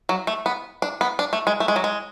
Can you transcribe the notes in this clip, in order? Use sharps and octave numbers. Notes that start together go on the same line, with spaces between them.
F#3
A3
B3
D4
B3
D4
A3
G#3
A3
G#3
F#3
G#3